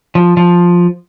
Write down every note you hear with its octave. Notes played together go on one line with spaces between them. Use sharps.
F3
F3